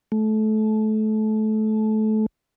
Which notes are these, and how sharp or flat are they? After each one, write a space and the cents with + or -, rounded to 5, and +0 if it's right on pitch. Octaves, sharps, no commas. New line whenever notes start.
A3 -25